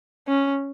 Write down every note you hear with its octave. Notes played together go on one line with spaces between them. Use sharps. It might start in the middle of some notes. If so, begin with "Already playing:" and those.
C#4